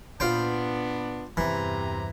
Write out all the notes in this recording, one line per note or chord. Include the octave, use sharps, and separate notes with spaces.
A#2 B3 D4 F4 C5 G5
E2 G2 C3 E3 A#5